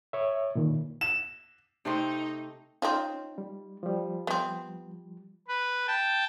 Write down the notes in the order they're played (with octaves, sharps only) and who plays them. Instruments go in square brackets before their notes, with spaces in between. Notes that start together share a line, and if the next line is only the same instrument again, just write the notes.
[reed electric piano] C#5 E5
A#2 D#3
[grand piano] E7
[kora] C3 A3 C4 [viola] D#4
[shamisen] C4 D#4 F4 [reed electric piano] C#4
[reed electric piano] G3
F3 G3
[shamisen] B3 C4
[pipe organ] B4
G5 A5